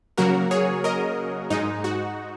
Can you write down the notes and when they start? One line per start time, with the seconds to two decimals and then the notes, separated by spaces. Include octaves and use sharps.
0.17 C#3 F#3 A#3 F#4 A#4
0.51 G#4 C#5
0.84 A#4 D#5
1.50 G#2 G#3 D#4
1.84 F#4